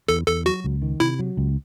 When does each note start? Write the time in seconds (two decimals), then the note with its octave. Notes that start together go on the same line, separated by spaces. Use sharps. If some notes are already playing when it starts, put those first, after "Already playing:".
0.08 E2 A4
0.27 E2 A4
0.46 F#3 F#4
0.64 C#2
0.82 D#3
1.00 C3 E4
1.19 F#3
1.37 C#2